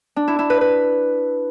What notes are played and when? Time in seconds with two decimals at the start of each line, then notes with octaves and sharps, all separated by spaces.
0.16 D4
0.28 E4
0.39 E4
0.50 B4
0.61 B4